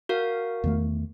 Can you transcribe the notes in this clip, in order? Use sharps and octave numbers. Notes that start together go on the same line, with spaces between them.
F#4 A#4 F5
E2 D#3 A3